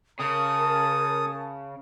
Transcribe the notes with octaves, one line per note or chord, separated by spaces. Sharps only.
C#3 A#4 C#5 A5 D#6